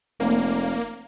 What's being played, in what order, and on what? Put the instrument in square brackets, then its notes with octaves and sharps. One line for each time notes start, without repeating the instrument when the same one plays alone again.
[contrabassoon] F1 [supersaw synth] A#3